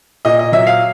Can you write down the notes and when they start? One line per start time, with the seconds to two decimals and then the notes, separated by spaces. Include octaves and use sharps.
0.25 A#2 D#5
0.39 D#5
0.52 F#3 E5
0.67 F5